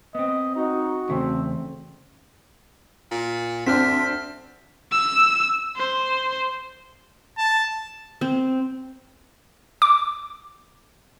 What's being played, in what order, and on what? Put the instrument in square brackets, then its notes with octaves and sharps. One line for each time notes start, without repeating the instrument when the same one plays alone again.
[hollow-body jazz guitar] B3 C4 [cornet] D#5
[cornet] D#4 [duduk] F#4
[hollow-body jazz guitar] E2 C#3 A3 [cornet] C4
[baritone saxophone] A#2
[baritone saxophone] D2 [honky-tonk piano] C4 D4 [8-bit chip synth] F6 B6
[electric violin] E6
C5
[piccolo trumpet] A5
[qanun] C4
[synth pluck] D6